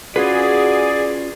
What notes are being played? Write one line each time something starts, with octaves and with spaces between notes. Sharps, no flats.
C#4 F4 F#4 G#4 B4 D5